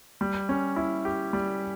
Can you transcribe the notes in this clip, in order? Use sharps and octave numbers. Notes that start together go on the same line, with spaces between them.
G3
C#4
E4
G4
G3